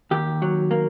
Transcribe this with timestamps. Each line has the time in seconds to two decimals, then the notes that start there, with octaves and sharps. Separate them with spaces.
0.11 D#2 G4
0.42 F#3
0.71 A#3